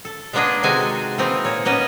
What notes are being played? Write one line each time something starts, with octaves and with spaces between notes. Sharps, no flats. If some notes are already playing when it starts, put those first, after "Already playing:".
A4
G#3 A#3 B3 D4 G#4 D#5
C3 D#3 G#3 F#4 A4 G#5
E3 A#3 C4 D#4
A#2 C#5
A#3 B3 C#4 D#5